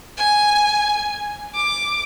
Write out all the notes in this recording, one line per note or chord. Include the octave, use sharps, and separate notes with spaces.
G#5
D6